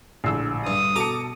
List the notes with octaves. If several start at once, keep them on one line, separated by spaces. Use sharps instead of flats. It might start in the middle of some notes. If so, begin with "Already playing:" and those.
A#1 A2 D3 E6 C7
G2 D#6
B2 A4 A5 A#5 D6 C#7